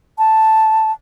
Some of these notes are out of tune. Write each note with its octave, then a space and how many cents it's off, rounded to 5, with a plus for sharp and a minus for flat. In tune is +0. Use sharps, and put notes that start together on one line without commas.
A5 +0